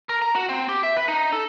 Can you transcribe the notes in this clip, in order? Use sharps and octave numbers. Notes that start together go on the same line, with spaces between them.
A#4
A#5
F#4
C4
G4
E5
B4
D#4
A4